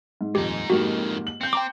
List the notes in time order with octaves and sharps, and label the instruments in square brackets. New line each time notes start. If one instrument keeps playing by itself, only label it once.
[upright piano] G#2
[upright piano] D#1 F2 [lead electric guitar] G#2 D#4 [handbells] G4
[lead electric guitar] F2 D#3 [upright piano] G#2 A#3 G4 [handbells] F#4
[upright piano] F#7
[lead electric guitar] C4 [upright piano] G6 C#7
[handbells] G5 A#5 D6